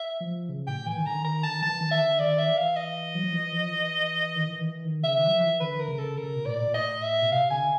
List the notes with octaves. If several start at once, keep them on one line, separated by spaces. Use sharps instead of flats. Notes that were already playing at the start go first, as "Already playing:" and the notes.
Already playing: E5
F3
C#3
A2 G5
E3 G#5
D#3
D3 A#5
D#3
A#5
D3 A5
D#3
E3 A5
D#3
E5
D3
D#3 D5
E5
E3
F5
D#5
F#3
F3
E3
F3
E3
D#3
E3
D#3
E3
D#3
C#3 E5
D#3
F#3
F3
E3
D3 B4
A#4
C#3
A4
C#3 A#4
B2
A2 D5
A#2
A#2
A2 D#5
E5
B2
C3 F5
D3 G#5